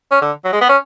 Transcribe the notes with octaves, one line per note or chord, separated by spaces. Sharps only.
C#4
D3
F#3
G#3
B3
C#4